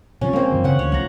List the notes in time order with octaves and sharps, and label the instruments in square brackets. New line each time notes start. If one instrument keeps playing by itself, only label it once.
[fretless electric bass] C3 F3 [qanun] C#4
[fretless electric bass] G#3 [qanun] A#3 C4
[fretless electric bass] F#2 D#3 F3
[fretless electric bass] C#3 E3 [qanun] C#4 F#5
[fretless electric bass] D2 [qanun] C#5
[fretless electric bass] C2 F3 G#3 [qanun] F#5 A#5